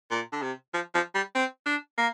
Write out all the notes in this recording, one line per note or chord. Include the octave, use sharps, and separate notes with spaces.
A#2
D3
C3
F3
F3
G3
C4
D4
A#3